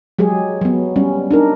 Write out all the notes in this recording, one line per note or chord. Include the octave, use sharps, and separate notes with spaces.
F#3 G#3 G4 G#4
F#3 B3
G3 C#4
D4 D#4 A#4